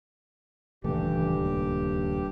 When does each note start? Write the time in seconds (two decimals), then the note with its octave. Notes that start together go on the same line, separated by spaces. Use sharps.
0.84 D#1 C#2 G2 E3 A3 G4
1.39 D#2